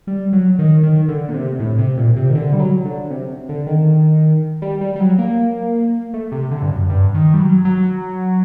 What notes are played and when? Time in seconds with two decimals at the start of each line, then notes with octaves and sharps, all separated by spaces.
0.07 G3
0.33 F#3
0.59 D#3
0.83 D#3
1.08 D3
1.29 A#2
1.34 C3
1.60 A2
1.78 C3
1.97 A#2
2.16 C3
2.30 D#3
2.35 D3
2.53 G3
2.60 F#3
2.85 D3
3.10 C3
3.49 D3
3.67 D#3
4.62 G3
4.81 G3
4.96 G3
5.00 F#3
5.18 A#3
6.14 A3
6.32 C3
6.51 D3
6.63 G2
6.71 F#2
6.89 G2
7.14 D#3
7.34 G3
7.40 F#3
7.65 F#3